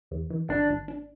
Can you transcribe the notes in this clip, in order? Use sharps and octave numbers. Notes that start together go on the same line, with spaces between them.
E2
E3
G#1 D4
G#1
D4